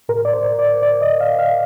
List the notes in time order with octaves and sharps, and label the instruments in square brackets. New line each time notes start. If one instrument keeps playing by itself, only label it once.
[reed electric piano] A2 A#4
D5
C5
D5
D5
D#5
F5
F5